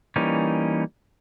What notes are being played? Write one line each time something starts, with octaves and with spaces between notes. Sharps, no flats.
E3 G3 A#3 C#4 D#4